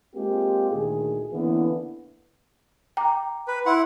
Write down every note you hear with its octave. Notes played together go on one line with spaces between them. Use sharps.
G#3 A#3 C4 F4 G4
D2 A#2 D#3 G#4
D3 E3 A#3 B3 C#4 E4
G5 A#5 D6
B4
E4 F#5 C6